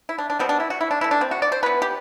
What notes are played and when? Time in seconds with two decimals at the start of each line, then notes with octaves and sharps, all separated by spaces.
0.09 E4
0.18 D4
0.30 D4
0.39 B2 G3 B3 C4
0.49 D4
0.60 E4
0.70 F#4
0.81 E4
0.91 D4
1.01 E3 A3 E4
1.11 D4
1.21 C4
1.31 F#4
1.42 D5
1.52 C5
1.63 E3 B3 B4
1.82 G4